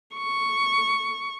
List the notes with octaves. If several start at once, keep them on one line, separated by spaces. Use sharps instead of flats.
C#6